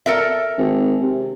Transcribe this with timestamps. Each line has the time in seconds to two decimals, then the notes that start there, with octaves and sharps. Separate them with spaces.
0.06 A4 A#4 E5
0.58 G#1
1.01 C3